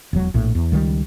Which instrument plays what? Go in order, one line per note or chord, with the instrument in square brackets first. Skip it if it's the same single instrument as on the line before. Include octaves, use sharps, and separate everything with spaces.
[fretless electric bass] E1 F#3
A#1 A2
E2
C#2 D#3 F3 G3